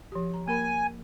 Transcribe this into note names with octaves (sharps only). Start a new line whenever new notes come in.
F3 G4
A#5
A#3 A#4 G#5 B5